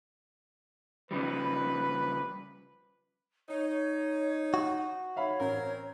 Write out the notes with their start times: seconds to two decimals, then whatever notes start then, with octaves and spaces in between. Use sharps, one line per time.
1.11 C#3 F3 G3 B4
3.49 D#4 C#5
3.70 C#5
4.54 F#4
5.16 C#5 E5 F5 B5
5.40 A1 C4 C#4 A#4 A#5